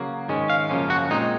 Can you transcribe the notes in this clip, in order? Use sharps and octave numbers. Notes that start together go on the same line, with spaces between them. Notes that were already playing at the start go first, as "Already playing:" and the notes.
Already playing: C#3 F#3 A#3
G#2 D#3 G#3 C#4
F5
F#2 C#3 F3 A#3 C#4
F#4
A#2 G#3 C4 D#4